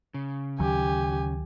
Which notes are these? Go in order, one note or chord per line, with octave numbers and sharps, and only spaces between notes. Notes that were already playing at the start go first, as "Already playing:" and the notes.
C#3
D2 D#3 F#3 G4 G#5